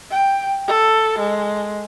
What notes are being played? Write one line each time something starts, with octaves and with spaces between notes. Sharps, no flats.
G5
A4
G#3